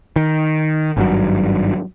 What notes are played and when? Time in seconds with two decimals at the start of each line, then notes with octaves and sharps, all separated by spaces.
0.16 D#3
0.97 G#1 G2 F#3